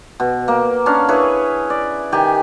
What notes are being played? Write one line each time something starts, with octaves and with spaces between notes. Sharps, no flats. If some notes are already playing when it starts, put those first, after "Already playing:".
B2
A#3
C#4 D4 F5
E4 G#4 B4 C#5
D5
D#3 G4 G#5